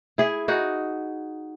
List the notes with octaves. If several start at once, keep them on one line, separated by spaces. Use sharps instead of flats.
E4 G#4
D#4 F#4 G#4